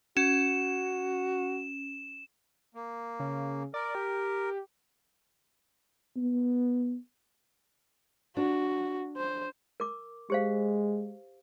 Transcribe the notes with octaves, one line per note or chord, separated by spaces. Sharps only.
C#4 F#4 E7
A#3
C#3
A#4 D5
G4
B3
D4 F#4
C5
A#4 D6
G#3 G4 C5 F5